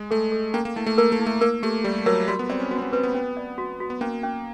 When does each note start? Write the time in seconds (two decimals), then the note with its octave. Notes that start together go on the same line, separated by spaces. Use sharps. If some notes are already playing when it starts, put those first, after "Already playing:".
Already playing: G#3
0.11 A3 A4
0.32 A4
0.54 A#3 C#4
0.65 A#3
0.76 A3 E4
0.86 A3
0.98 A#3 A#4
1.12 A3
1.19 E4
1.26 A3
1.41 A#3 A#4
1.63 A3 G4
1.84 G3 G4
2.06 F#3 A#4
2.28 G3 F#4
2.39 B3
2.49 C4 D5
2.60 C#4
2.71 B3 F#4
2.78 C4
2.82 B3
2.93 C4 B4
3.03 B3
3.14 C#4
3.37 D5
3.58 F#4
3.80 F#4
3.90 B3
4.01 A#3 C#4
4.23 C#4